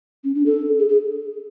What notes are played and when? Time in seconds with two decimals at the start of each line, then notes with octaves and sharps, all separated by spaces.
0.24 C#4
0.35 D4
0.46 A4
0.79 G#4
0.89 G#4